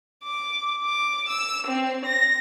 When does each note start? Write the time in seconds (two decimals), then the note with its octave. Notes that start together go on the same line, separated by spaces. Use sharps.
0.24 D6
0.83 D6
1.29 E6
1.67 C4
2.06 A#6